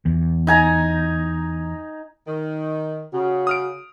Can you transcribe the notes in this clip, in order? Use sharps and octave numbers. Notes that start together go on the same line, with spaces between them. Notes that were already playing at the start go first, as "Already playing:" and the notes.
E2
D#4 G#5 A#5
D#3
C#3 F#4
D#6 F6 D7